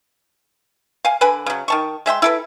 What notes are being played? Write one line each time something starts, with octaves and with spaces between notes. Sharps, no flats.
F5 G#5
D3 B4 G#5 B5
C#3 F#3
D#3 A5 C#6
G#3 E5 G5 C6
E4 A4 B4